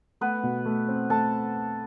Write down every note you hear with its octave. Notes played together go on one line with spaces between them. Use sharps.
A3 B3 B4
B2
A3
C4
A3 A4 A5